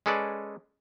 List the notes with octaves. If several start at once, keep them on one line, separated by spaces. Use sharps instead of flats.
G#3 C#4 G#4 A4 B4 D5